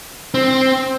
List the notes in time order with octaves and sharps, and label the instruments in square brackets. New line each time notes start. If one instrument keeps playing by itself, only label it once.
[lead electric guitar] C4